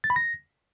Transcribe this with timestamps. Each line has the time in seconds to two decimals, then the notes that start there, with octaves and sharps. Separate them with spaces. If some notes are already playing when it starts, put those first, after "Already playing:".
0.04 A6
0.10 B5
0.16 A#6